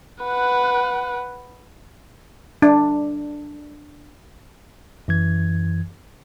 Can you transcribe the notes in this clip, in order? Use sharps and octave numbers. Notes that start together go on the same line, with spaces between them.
B4 F#5
D4
F#2 E3 G#6